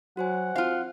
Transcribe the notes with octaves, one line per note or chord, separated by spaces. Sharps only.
F#3 F#4 C5 F#5 G#5
C4 F4 F5